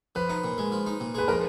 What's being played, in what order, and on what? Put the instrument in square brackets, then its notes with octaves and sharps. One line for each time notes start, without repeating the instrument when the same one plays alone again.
[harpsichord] F3 [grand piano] B4
[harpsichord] D#4
A#2
G#3
F3
D#4
A#2
[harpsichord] G#3 [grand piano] B4
[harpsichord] F3 [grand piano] A#4